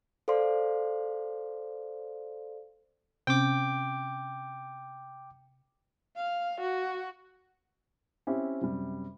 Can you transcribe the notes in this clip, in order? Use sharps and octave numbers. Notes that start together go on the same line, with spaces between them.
A4 C5 D5 F5 C6
C3 C4 C#4 G5 D6
F5
F#4
C4 C#4 E4 G4
F#2 C3 G3